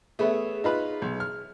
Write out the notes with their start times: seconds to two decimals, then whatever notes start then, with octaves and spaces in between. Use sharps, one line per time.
0.19 A3 B3 G#4 C#5 E5
0.64 D#4 F4 B4
1.02 B1
1.20 F6